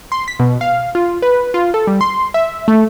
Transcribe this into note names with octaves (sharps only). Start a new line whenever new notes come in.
C6
B6
B2
F5
F4
B4
F4
A4
G3
C6
E5
A3